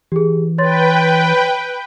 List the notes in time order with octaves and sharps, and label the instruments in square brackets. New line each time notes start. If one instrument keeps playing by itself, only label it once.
[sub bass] E3 [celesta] G4 G#4
[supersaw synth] B4 G5 [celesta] C#5 C6 A6